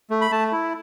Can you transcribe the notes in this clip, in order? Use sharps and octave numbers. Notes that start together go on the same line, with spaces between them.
A3
B5
A3 A5
E4